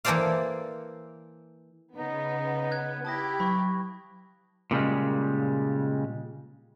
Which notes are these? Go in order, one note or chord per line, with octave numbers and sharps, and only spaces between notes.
E3 A#3 A4 C5 D5 F5
C#3 B3 D#4
F#6 G#6
E4 G4 A5 D#6 A#6
F#3 B5 C#6
A#2 C#3 G3 G#3